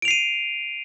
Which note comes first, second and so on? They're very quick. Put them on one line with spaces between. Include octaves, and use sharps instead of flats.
D7 F7 C7 D#7